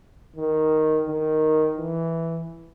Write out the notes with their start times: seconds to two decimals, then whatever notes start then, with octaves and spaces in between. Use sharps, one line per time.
0.36 D#3
1.07 D#3
1.78 E3